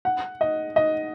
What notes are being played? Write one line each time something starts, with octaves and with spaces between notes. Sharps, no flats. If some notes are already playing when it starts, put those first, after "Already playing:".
F#5
D#5
D#5